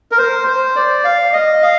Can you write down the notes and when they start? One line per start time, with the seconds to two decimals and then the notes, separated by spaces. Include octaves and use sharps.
0.11 A#4
0.18 C5
0.48 C5
0.76 D5
1.05 F5
1.33 D#5
1.62 F5